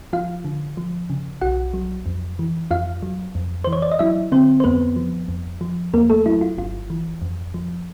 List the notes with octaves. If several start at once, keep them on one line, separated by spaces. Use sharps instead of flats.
F3 F4 F5
D3
F3
C#3
B1 F#4 F#5
F#3
F2
E3
F2 F4 F5
F#3
F2
E3 C5
C#5
D5
D#5
F#3 E4 E5
D3 C4 C5
C5
F2 B3 B4
F3
F2
F3
E2 A#3 A#4
A3 A4
F#3 E4
F4
G1 F4
E3
F2
F3